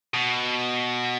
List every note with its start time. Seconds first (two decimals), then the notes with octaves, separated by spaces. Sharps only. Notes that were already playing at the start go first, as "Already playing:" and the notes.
0.14 B2